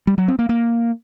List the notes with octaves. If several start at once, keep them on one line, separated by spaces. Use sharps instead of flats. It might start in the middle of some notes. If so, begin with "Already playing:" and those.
G3
F#3
C4
A#3
A#3